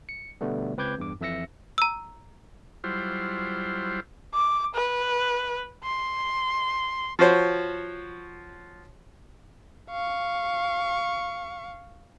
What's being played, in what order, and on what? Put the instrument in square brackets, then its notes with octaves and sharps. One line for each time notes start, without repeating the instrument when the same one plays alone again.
[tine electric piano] C#7
B2 D3 G3 A3 B3
C#2 C4 B4 D6 G6 G#6
E2 G2 D6
F2 E3 E5 E6 A#6 C#7
[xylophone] A#5 E6
[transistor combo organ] F#3 G3 E4 F4 C5
[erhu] D6
B4
C6
[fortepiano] F3 F#4 C5 C#5
[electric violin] F5 C#6